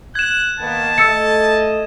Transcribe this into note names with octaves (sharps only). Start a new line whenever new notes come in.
F#6 G#6 E7
D#3 A#3 B3 A5
A3 D#5 E6 A6 C#7